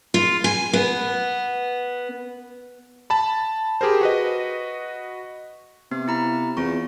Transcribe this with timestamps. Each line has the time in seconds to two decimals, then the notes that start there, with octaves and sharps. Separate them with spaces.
0.14 F4
0.44 G#5
0.73 B3
3.10 A5 B5
3.81 G4 G#4 A#4 C5
4.01 F#4 B4 D#5
5.91 C3 B3
6.08 E4 A#5 B5
6.57 E2 C4 F4 C#6